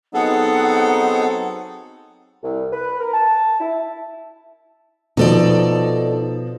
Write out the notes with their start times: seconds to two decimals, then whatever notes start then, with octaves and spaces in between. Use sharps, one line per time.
0.14 F#3 B3 C4 D#4 G#4 A4 F#5
2.43 C2
2.72 B4
3.00 A#4
3.13 A5
3.60 E4
5.17 B2 F3 D#4 A4 D5